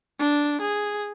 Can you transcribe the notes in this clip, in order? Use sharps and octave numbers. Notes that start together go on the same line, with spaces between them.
D4
G#4